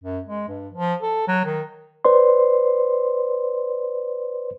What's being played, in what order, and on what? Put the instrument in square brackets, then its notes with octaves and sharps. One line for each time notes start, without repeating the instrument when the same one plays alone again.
[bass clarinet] F#2
G#3
G2
F3
A4
F#3
D#3
[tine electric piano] B4 C5 D5 C6